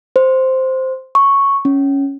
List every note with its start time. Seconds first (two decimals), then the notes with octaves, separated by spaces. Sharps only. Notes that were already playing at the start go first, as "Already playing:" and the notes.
0.16 C5
1.15 C#6
1.65 C#4